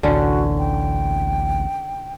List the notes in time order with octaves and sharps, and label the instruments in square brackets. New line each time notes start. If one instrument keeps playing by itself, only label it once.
[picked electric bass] A1 D2 [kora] D3 C#4 [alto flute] F#4
[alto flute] G5